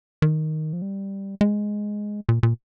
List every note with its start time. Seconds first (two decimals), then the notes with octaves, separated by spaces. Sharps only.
0.22 D#3
0.73 F3
0.82 G3
1.41 G#3
2.29 A#2
2.43 A#2